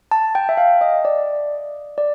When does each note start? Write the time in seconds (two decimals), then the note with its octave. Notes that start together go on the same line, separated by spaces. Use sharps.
0.11 A5
0.35 G5
0.49 E5
0.57 F5
0.81 D#5
1.05 D5
1.98 D5